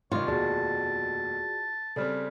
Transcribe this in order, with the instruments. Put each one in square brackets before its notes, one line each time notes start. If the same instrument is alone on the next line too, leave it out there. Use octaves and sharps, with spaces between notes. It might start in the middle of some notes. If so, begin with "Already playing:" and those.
[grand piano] G2 C3 D#3 [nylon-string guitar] F4 [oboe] C#5
[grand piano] F1 D#2 B2 [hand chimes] F#4 G#4 D5 [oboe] A5
[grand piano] C#3 G3 C4 [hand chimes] A4 D5 F6